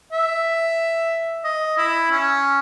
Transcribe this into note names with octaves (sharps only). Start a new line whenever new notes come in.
E5
D#5
E4
C#4